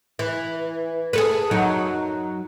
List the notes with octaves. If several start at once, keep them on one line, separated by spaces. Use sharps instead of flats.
E3
G#4 A4 B4
F#2 F#3 D#4